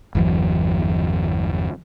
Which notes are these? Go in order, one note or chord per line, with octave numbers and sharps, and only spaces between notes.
G1 E2 E3 F#3